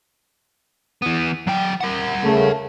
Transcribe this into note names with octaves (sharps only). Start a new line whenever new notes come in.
E3 B3
F#3 G5
A#4 F#5
C#3 A3